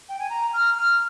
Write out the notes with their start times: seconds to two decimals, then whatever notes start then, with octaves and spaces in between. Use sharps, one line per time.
0.08 G5
0.19 G#5
0.29 A#5
0.53 F6
0.77 F6